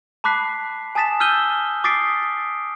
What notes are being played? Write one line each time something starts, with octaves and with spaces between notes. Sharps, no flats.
A5 B5 D6 F#6 B6 C7
G#5 A5 D#6 A6 B6 E7
E6 F6 G6 D#7 G7
D6 D#6 A6 B6 C7 D7